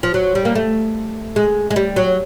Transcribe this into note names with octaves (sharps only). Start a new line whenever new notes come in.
F3
F#3
G3
A#3
A3
G#3
G#3
G3
F#3